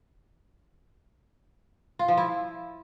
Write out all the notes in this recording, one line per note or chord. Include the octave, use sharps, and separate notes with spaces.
F4
F3
E4